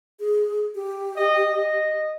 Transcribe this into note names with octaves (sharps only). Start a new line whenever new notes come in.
G#4
G4
D#5
D#5